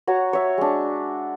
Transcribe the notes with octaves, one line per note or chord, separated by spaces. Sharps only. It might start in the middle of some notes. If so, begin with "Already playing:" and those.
F#4 C#5 A#5
C#5 E5
G#3 D4